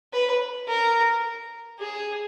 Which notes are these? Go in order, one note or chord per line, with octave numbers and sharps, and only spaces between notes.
B4
A#4
G#4